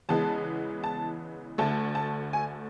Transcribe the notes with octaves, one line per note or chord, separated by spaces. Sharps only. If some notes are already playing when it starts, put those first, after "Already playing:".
E2 C#3 E3 G#3 B3 A5
A5
D2 D3 A3 A5
A5
G#5